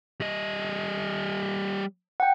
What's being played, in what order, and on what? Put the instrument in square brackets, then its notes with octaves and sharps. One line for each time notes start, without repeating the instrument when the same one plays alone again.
[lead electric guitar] G3 D#5
[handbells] F#5 G5